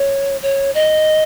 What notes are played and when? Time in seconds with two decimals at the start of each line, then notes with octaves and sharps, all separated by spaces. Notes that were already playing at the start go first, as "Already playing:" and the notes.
Already playing: C#5
0.42 C#5
0.75 D#5